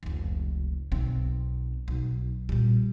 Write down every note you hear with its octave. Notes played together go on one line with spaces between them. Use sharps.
F1 C#2
B1 C4
B1
A#2 G3